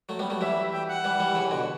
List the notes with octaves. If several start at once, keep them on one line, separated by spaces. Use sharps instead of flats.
F#3 A3
G3 B3
F#3 A3
E3 G3 E5
G5
F#5
E3 G3
E3 G3
C#3 E3
B2 D3